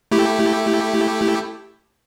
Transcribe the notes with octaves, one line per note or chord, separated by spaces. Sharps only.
A3 E4 G4